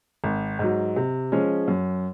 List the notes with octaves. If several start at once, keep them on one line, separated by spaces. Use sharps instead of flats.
G#1
G#2 F#3
C3
F3 G#3 C#4
F#2